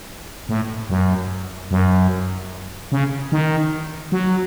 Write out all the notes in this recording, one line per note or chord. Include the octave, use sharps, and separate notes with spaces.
A2
F#2
F#2
C#3
D#3
F#3